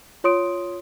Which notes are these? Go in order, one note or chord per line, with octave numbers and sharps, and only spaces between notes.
F4 C#5 C6 D#6 D7